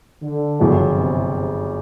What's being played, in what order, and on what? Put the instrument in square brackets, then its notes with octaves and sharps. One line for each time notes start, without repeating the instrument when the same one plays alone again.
[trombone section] D3
[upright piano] G1 F#2 C#3 F3
[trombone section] C3